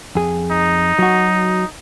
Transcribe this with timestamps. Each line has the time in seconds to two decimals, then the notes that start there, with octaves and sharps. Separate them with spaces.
0.15 F2 G#4
0.51 D#4
0.99 F#3 F#4